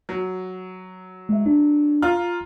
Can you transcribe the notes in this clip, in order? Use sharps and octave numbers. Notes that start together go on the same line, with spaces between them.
F#3
G#3 E5
D4
F4 A#5 F6